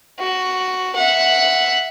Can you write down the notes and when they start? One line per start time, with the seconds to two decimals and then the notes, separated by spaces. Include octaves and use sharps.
0.19 F#4
0.95 E5 F#5